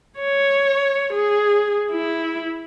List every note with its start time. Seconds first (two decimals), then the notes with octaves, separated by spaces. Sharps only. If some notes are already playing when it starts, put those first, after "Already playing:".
0.20 C#5
1.13 G#4
1.92 E4